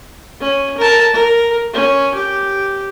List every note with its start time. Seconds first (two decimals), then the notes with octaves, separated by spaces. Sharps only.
0.41 C#4
0.77 A#4 A5
1.13 A#4
1.74 C#4
2.14 G4